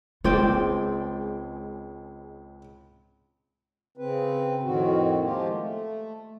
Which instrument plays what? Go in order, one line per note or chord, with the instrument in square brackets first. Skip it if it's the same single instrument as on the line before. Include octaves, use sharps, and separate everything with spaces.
[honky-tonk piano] C#2 G#3 [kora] C4 D5 G5 [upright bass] F4
[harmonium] C#3 C4 B4
F2 A2 D#3 C4 F#4
F3 G#3 A#3 F4 G4
A3